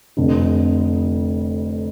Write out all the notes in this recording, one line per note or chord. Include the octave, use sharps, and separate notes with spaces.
F1 F2 D3